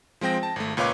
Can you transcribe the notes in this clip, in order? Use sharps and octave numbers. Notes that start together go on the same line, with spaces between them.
F3 G#3 C4 G5 A#6
A5
G#1 A3
C#2 A#2 B4 C#5 F5 D6